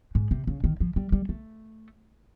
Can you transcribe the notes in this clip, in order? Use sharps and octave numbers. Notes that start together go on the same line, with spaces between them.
G#2
C3
C#3
D#3
F3
G3
G3
A3